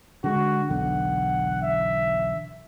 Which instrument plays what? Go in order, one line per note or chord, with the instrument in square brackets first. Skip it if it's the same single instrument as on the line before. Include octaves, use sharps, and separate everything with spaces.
[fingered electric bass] D3 G#3 [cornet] F#4
[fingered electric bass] B1 E2 D3 [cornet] F#5
[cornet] E5